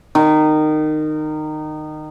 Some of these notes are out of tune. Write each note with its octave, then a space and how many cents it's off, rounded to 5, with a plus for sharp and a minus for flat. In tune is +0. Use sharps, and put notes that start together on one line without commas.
D#3 -20